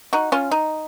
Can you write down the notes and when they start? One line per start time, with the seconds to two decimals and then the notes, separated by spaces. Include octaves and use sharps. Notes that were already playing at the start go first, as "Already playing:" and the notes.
0.13 D#4 F#4
0.32 C#4 F4
0.51 D#4